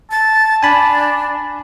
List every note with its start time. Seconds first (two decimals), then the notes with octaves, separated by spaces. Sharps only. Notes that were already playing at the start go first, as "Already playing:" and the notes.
0.11 A5 A6
0.63 D4 G#5 B5